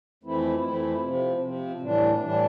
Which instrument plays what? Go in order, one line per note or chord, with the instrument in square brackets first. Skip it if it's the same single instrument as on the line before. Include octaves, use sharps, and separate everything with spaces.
[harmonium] F2 E3 A3 C4 E4
F2 E3 A3 C4 E4
C3 F3 C4
C3 F3 C4
A2 E3 G3 D4
A2 E3 G3 D4